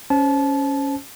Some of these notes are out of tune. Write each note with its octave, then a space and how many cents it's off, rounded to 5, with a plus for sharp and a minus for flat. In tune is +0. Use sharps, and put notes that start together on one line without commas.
C#4 +0 C5 +0 A5 -30